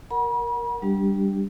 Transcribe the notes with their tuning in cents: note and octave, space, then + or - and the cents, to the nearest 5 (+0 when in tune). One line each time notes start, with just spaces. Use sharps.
A#4 +0 F#5 +0 B5 -45
G3 +0 D4 -5 G4 +0